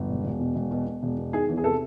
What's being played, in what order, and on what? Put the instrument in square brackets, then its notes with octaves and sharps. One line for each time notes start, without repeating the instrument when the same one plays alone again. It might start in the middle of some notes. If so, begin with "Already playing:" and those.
Already playing: [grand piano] G1
E1
E1
B2
E1
B2
B2
E1
B2
D#3 G#4
E2
G#4
C3 A4